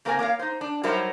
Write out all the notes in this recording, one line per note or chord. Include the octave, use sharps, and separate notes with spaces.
C#3 A#3 C4 A#4 D#5 G#5
A#3 A#4 C#5 F5
D#4 C5
D4
F#3 G3 D#4 A#4 C5 E5